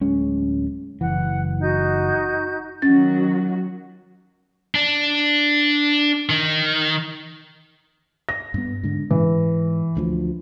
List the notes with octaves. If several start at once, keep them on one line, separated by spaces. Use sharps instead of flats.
D1 G#3 C#4
F#1 E3 F#5
D#4 F#4 G6
D#3 F#3 C#4 F#4 A6
D4
D#3
A#6
G2 B3
G#2 D3
G#2 E3
D2 F3